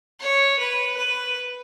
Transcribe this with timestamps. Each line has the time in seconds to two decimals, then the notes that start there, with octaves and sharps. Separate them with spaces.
0.20 C#5
0.59 B4
0.97 B4